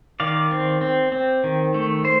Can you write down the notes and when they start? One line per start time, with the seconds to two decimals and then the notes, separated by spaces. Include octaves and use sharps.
0.20 D#3 D5 F5
0.51 C4
0.81 C4
1.12 C4
1.44 D#3
1.74 A3
2.05 C5